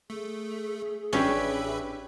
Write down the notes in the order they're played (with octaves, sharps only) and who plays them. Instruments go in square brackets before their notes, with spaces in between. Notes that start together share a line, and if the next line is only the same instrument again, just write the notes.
[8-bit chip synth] A3 [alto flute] G#4
[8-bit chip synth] A1 B4 E5 [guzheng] C#4 [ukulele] D4 G4